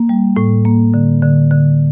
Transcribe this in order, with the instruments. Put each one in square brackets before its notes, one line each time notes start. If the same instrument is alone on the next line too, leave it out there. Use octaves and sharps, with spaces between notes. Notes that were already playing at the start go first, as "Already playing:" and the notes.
Already playing: [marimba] A#3
G3
A2
A#3
D3
D3
D3